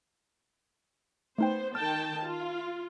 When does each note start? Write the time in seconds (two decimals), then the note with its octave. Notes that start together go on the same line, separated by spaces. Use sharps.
1.38 A3 B3 D#4 C5 G5
1.75 D#3 G5 A5 F6
2.23 F4